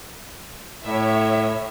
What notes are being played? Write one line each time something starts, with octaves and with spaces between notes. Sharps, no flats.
A2 C#5 E5